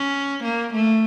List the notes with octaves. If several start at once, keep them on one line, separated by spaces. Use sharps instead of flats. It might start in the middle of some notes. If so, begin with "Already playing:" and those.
Already playing: C#4
A#3
A3